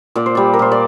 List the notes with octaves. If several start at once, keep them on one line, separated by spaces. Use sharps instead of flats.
A#2 D5
C5
G3 D5
A#4
A#2 C5
D5